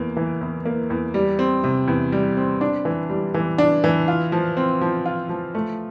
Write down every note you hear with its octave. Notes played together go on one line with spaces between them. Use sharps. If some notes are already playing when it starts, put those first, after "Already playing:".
Already playing: E2 A#3
E3
E2
A#3
E2
G3
C4
C3
E2
G3
C4
D4
E3
G3
E3
D4
E3
F4
F3
C4
F3
F4
F3
A3